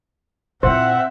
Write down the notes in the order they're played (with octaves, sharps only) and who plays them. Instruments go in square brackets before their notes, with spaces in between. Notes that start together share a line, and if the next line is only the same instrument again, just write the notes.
[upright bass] A#2 E4 [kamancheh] C4 E5 [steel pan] C5 [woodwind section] F#5